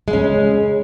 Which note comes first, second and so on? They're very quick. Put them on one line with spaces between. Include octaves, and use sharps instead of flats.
G#3 C#3 C#4